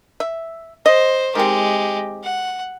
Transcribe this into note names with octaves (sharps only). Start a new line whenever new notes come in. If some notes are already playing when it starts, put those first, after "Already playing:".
E5
C5 D#5
D#3 G#3 C4 G4
F#5